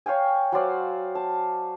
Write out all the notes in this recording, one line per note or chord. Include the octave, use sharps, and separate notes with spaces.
C#5 F5 G5 G#5
F#3 C5 D5 F5
A5